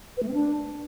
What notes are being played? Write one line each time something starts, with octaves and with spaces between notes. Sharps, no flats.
B4
A3
C4
D4